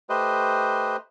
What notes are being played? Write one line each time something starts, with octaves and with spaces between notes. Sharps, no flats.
A3 G4 B4 C5 D#5